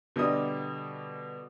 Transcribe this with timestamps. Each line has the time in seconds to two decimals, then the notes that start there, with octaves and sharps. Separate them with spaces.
0.16 B2 D3 G3 D#5 D#6